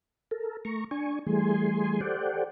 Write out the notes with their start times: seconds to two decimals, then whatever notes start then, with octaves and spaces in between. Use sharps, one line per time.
0.31 A4 A#4
0.65 A3 A#5 C#6
0.91 D4 G#5 C#6
1.27 E3 G3 A3 G#4 G#5 C6
2.01 G4 A4 C5 D5 F#5 G5